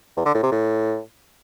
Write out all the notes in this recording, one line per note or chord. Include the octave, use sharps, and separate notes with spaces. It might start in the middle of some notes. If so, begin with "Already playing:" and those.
E2
D3
A2
C3
A2